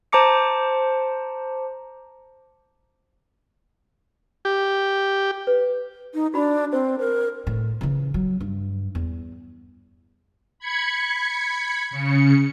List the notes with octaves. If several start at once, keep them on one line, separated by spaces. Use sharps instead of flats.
C5 A5 A#5 D6 C#7
G4
B4
D#4
D4 F#4 B5
C4 C5
A#4 C5
A2
C#3 E3
F#3
G2
E2
B5 G#6 C#7
C#3 C#7